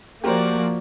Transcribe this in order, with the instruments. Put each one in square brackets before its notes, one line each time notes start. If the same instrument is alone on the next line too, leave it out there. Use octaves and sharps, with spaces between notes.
[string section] F3 A#3 [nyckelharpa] F#4 D5 [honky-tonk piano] G4 A#4 C5